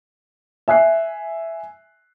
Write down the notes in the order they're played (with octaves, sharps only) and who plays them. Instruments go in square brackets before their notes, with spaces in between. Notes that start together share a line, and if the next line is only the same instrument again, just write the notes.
[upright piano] E5 G#5 F#6 C7